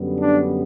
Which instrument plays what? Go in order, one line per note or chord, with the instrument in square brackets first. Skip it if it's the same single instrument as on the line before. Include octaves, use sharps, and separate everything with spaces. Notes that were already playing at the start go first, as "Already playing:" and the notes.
Already playing: [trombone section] F#2 D3 G3 B3
D4